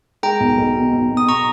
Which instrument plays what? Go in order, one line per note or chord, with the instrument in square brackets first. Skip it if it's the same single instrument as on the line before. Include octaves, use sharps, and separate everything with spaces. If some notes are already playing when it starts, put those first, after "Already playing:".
[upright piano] G#3 [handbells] G5 A#5
[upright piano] B1
B1
B2
B1
B2
[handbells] D#6
A#5 C#6